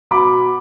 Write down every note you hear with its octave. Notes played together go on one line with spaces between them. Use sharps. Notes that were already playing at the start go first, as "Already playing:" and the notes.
B2 B5 D6